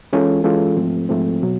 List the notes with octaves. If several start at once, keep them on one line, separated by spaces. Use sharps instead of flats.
E3 G#3 C#4 F4 A4
E3 G#3 C#4 F4 A4
G#2 F3 A3 C4
G#2 F3 A3 C4
B2 F#3